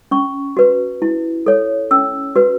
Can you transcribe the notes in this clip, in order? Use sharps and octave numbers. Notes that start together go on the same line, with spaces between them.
C#4 C#6
F#4 B4
E4
A4 C#5
C#4 E6
F#4 B4